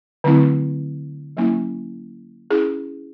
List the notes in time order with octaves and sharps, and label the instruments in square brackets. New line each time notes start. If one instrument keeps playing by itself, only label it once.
[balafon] D3 F#3 A3 C4 E4
F#3 A#3 C#4 E4
C#4 E4 G#4